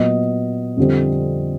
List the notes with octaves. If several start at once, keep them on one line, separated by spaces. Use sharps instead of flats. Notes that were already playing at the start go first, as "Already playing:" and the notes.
Already playing: A#2 F#3 B3 D#5
F2 D3 G3 C4